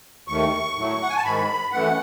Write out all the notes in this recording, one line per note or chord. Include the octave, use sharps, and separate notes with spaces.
D#2 D#3 A3 C#6
A2 F#3 A3
F#5
G#5
A5
G#2 D#3 G#3 B5
F#2 E3 A3 F#5